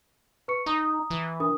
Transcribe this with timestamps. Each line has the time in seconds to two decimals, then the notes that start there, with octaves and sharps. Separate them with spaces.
0.48 B4 C#6 C#7
0.66 D#4 A#5 D#6
1.10 E3
1.40 D4 A#4 D#6